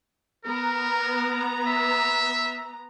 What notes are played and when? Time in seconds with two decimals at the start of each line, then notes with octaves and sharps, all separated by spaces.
0.45 B3 A#4 A#5
1.67 E5